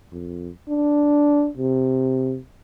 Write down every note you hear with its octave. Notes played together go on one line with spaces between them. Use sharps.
F2
D4
C3